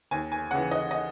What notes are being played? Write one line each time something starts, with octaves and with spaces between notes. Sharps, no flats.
D#2 G#5
G#5
C#3 E3 F#5
D#5
D#5